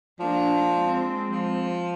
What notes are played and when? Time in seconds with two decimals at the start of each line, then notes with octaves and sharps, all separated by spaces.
0.20 F3 A#3 D4
0.74 G#3 C4
1.30 F3